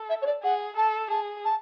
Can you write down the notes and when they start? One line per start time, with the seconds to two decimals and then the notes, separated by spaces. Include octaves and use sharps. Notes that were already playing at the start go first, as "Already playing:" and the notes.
Already playing: A4
0.09 E5
0.22 C#5
0.26 D5
0.43 G#4 F#5
0.77 A4 A5
1.10 G#4 A5
1.45 A5